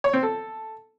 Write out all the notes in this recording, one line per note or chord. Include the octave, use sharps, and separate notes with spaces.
C#5
C4
A4